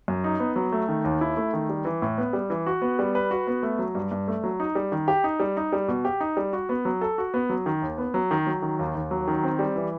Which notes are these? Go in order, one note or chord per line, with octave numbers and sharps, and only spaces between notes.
F#2
D#4
B3
F#3
A3
D#3
D#2
E4
A3
D#3
G3
E3
A2
B3
G3
E3
F#4
B3
G3
B4
F#4
B3
A3
F#3
G2
G2
A3
F#3
D#4
G3
D#3
G4
D#4
G3
D#4
G3
B2
G4
D#4
G3
F#4
B3
F#3
A4
F#4
B3
F#3
D#3
D#2
B3
F#3
D#3
F#3
D#3
D#2
D#2
F#3
D#3
C4
G3
E3